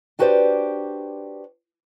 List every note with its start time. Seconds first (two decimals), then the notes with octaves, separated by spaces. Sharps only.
0.19 D4 F#4 G4 B4 C5 D5